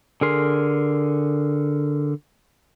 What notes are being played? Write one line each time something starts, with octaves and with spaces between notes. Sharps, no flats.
D3 G#4 A#4 C6